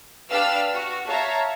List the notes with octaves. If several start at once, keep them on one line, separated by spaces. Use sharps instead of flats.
D4 G4 B4 F5 E6 F6
F#4
C#5 E5 F5 A5 A#5